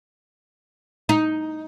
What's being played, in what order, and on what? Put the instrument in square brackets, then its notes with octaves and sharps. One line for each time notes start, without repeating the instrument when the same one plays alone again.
[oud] D#4